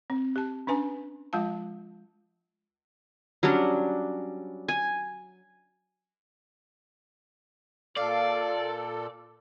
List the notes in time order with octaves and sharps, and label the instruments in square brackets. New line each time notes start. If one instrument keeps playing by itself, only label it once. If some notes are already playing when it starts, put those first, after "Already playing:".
[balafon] C4
G4 A5
C#4 D4 B4 G#5 A#5
F3 G#3 F4 F5 A5
[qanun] F#3 G3 C#4 D4
G#5
[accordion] A#2 A4 [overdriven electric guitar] D5 [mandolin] F5